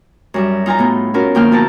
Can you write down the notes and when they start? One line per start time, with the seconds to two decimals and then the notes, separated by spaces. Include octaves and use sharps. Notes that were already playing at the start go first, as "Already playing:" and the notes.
0.34 F#2 G3 E5
0.66 D#4 F4 G#5 A#5
0.79 A2 B3
1.14 C#4 F4 F#4 A#4
1.35 D2 F3 A#3 G5 F6 G6
1.52 B3 E4 A5 A#5